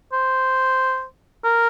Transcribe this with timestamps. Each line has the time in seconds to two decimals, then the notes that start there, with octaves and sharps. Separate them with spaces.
0.13 C5
1.44 A#4